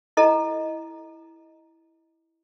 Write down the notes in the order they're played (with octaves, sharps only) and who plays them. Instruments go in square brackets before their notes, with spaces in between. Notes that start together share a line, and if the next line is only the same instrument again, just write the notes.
[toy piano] E4 A4 D#5 A#5